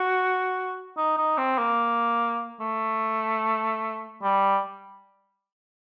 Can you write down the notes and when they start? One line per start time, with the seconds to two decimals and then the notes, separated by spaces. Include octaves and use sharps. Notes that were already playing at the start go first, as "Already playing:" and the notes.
Already playing: F#4
0.97 D#4
1.17 D#4
1.38 C4
1.58 A#3
2.60 A3
4.23 G3